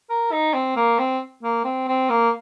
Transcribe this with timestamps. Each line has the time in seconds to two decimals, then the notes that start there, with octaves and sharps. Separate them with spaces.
0.10 A#4
0.32 D#4
0.54 C4
0.76 A#3
0.99 C4
1.43 A#3
1.64 C4
1.88 C4
2.10 A#3